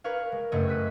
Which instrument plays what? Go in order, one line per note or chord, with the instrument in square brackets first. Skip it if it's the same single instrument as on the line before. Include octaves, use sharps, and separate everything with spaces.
[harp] A#4 B4 C#5 F5
G#3
F#1 F#2 A3 C#5 D#5
F#6 B6 D#7